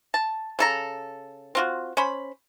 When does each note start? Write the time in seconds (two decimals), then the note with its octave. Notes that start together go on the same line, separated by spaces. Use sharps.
0.14 A5
0.59 C#3 A4 A#5
1.55 C4 F4 F#4
1.97 C#4 C5 B5